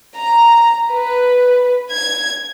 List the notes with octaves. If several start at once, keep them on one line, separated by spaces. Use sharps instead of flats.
A#5
B4
G#6